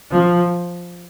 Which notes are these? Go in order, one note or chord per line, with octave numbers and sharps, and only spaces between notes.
F3